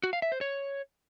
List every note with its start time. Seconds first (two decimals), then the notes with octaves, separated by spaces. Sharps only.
0.04 F#4
0.13 F5
0.22 E5
0.32 C5
0.41 C#5